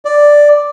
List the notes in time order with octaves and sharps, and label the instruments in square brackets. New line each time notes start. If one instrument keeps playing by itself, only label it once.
[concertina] D5